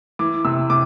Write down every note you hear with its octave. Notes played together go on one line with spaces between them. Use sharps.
E3 D6
C3 E6
C3 D6